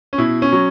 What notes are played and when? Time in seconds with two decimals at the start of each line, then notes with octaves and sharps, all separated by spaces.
0.13 C#4
0.18 B2 E4
0.42 C#4
0.53 F#3